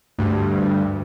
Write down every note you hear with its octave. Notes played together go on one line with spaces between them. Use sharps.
D2 G2